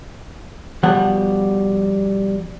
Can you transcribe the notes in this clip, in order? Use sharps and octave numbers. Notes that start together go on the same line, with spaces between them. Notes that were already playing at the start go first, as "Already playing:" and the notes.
B2 F3 G3 F#5